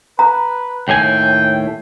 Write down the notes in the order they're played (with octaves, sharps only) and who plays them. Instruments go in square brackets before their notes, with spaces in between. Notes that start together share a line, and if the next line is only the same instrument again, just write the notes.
[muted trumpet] B4 [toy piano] A#5
[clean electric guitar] D#2 A2 G#5 [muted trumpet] G5